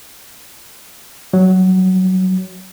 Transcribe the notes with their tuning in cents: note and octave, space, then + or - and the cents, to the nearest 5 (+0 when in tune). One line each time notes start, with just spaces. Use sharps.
F#3 +10